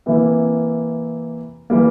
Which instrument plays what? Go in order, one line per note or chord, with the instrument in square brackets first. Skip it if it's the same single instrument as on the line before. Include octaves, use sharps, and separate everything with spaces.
[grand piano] C3 E3 A#3 E4
E3 G3 A#3